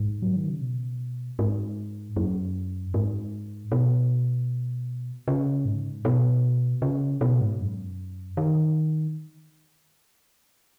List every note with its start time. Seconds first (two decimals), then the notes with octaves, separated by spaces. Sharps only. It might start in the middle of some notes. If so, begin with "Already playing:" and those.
Already playing: G#2
0.22 F#3
0.36 D#3
0.49 C#3
0.61 B2
1.39 G#2
2.16 F#2
2.94 G#2
3.72 B2
5.28 C#3
5.65 G#2
6.05 B2
6.82 C#3
7.21 B2
7.41 G#2
7.60 F#2
8.37 D#3